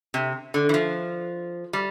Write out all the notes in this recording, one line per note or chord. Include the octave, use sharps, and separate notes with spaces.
C3
D3
E3
F3
G3